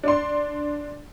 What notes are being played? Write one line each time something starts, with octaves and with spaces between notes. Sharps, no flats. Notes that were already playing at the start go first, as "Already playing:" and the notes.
D4 D5 C6